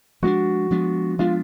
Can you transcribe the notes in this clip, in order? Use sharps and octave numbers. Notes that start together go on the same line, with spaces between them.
F3 G#3 B3 D4 F#4
F3 G#3 B3 D4
F3 G#3 B3 D4 F4